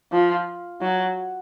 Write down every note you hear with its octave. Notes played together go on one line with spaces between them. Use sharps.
F3
F#3